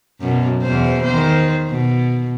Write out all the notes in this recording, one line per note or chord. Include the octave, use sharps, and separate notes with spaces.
F#2 B2
E2 B2 C5
D#3 C5
B2